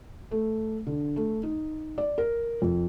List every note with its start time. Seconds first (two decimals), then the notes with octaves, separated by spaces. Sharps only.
0.31 A3
0.87 D3
1.16 A3
1.43 D#4
1.98 D5
2.18 A#4
2.62 F2